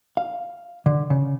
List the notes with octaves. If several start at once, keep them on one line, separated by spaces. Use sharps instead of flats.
F5
D3
C#3